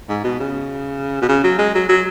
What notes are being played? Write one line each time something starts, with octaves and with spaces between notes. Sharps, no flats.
G#2
B2
C#3
B2
C#3
F#3
G#3
F#3
F#3